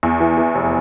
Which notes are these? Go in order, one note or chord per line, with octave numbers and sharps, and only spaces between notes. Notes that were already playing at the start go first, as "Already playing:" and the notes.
E2
E3
E3
F1